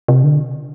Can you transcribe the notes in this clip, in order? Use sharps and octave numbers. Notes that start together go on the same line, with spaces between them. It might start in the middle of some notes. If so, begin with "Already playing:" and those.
C3
D3